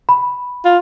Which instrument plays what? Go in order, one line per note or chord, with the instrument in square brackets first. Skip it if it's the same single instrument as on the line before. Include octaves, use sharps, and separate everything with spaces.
[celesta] B5
[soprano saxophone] F4